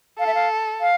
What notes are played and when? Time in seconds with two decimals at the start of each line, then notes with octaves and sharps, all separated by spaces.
0.18 A4 F5
0.27 E5
0.34 F5
0.81 F5